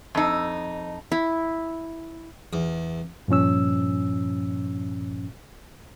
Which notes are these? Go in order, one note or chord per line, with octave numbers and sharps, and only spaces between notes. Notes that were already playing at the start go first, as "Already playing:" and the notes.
F2 D#4
E4
E2
G2 A#2 F3 C#4 E6